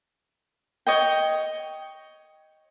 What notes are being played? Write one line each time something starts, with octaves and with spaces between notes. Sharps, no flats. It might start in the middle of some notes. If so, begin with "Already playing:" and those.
C#5 D#5 G5